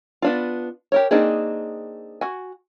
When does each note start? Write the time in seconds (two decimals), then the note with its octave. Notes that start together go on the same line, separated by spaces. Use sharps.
0.22 B3 D4 F4
0.92 G4 A#4 C#5
1.11 A#3 C4 D4 D#4 G#4
2.21 F#4 G#5